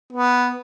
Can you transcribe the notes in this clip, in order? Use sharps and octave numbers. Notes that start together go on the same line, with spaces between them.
B3